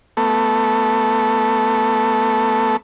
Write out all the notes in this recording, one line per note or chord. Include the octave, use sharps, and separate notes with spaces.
A3 B3 A4